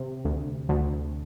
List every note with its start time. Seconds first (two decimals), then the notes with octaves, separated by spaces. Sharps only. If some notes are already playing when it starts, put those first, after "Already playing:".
Already playing: C3
0.25 D2
0.69 D2